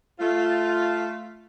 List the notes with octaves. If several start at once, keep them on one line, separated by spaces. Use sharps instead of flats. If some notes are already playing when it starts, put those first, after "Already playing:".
A3 F4